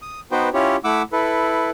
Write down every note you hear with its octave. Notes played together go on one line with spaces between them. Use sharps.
D#6
B3 D#4 F#4 B4 C5 G5
C#4 E4 F4 G4 C#5
A3 E4 F#5 D6 E6
E4 A4 B4